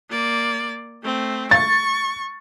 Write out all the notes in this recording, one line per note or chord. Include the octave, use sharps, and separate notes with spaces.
A#3 D5
A3 C4
C#6 A6